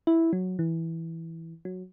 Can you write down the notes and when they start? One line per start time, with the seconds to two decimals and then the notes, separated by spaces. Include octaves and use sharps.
0.07 E4
0.33 F#3
0.59 E3
1.65 F#3